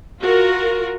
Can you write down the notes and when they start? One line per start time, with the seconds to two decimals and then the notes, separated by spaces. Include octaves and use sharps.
0.21 F4 F#4 A#4